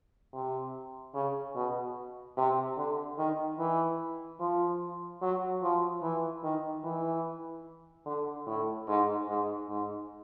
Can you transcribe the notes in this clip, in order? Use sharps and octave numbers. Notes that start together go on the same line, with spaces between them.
C3
C#3
B2
C3
D3
D#3
E3
F3
F#3
F3
E3
D#3
E3
D3
A2
G#2
G#2
G#2